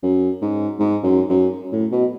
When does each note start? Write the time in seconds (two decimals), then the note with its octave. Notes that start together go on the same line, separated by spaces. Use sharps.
0.03 F#2
0.42 G#2
0.79 G#2
1.03 F#2
1.29 F#2
1.72 A2
1.92 B2